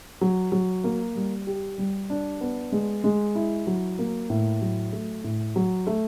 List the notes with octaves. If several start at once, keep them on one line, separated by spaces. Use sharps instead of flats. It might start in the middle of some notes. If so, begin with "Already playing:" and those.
F#3
F#3
A#3
G3
G4
G3
D4
B3
G#3
G#3
E4
F#3
A#3
A2
F#3
A3
A2
F#3
A3